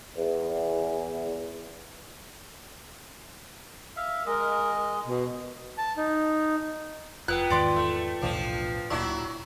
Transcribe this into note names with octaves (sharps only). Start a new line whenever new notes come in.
E2
E5 F5
G#3 A#4 D#5
B2
A5
D#4
F1 B3 F4 B4 G5 F#6
E2 G#2 D#3 D5 C6 D6
A3
B1 E2 A2 F3 D4
D1 A#2 F#3 D4 E4 C#6